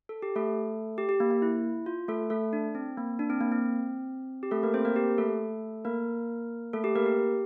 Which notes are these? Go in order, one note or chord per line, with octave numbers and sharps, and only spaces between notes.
A4
G4
A3 A4
G4
G4
A#3
A#3
E4
F4
A3 A4
A3 A4
D4
C4
A#3
D4
C4
A#3
C4
G4
A3 A4
A#3 A#4
C4 C5
A#3 A#4
G4
A3 A4
A#3 A#4
A3 A4
G4
A#3 A#4
G4